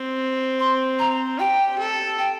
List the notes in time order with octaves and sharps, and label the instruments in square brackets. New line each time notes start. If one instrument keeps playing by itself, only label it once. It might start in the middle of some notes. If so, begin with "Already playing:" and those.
Already playing: [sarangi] C4
[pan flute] C6
A#5
[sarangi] G4 [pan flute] G5
[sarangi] A4
[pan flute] G5